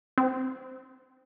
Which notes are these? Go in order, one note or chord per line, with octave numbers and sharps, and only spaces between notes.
C4